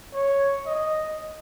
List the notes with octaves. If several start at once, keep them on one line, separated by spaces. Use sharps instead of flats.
C#5
D#5